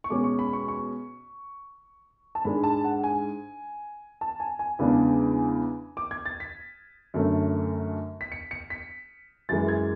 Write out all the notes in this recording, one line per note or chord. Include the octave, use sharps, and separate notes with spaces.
C#6
B2 G#3 C#4 D6
C#6
B5
C#6
C#6
A5
G#2 G#3 D4 B5
A5
F#5
G#5
A5
G#5
G#5
E2 C#3 G#3 B3 D4
D6
G#6
A6
B6
F#2 D3 A3 C#4
B6
C#7
C#7
B6
F#2 E3 G#3 A6
G#6